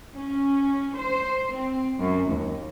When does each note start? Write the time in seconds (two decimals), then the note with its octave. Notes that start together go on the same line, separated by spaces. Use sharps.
0.14 C#4
0.96 C5
1.51 C4
1.99 F#2
2.31 D#2